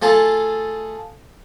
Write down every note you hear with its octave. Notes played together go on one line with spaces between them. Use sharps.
A3 F4 G#4 A4